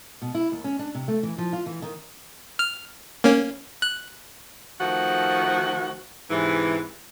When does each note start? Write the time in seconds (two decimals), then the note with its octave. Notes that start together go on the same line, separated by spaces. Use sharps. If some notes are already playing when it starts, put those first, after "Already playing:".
0.22 B2
0.35 E4
0.52 D#2
0.64 C#4
0.79 D4
0.95 C3
1.08 A3
1.23 E3
1.38 F3
1.53 F4
1.66 E3
1.82 D#3
2.59 F6
3.24 A#3 C#4
3.82 F#6
4.80 D#3 F3 A3 F#4
6.29 G#2 C3 E3